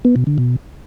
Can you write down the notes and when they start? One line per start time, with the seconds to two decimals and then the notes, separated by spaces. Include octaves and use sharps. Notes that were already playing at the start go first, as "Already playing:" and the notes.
0.05 B3
0.16 B2
0.27 D3
0.38 B2